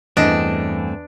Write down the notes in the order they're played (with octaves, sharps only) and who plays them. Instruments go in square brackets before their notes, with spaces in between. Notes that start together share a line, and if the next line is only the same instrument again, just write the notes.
[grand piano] E2 [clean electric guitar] G2 A3 C4 [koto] D4 [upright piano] D#5